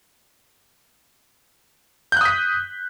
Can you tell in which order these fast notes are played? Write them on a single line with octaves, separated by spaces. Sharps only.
G6 F#6 D#6 B6